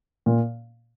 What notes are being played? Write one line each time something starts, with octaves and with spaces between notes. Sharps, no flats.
A#2